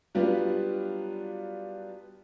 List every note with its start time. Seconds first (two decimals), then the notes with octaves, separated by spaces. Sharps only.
0.15 F#3 G3 B3 D4 F4